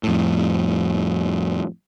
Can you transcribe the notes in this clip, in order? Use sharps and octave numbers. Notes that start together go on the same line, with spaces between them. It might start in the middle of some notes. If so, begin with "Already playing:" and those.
F2 A2